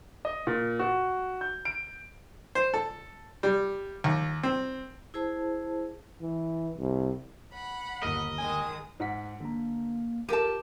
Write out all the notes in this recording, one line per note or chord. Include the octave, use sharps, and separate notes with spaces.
D#5
A#2
F#4
G6
D7
C5
A4
G3
D#2
C4
E4 G#4 C5 A5
E3
C2
F#5 B5
G1 D#2 A#4 D#5
D#3 G#3 G#5 D#6
G#2 F#5 B6
D3 A#3 A#5
F4 G4 A4 A#4 A5 D#7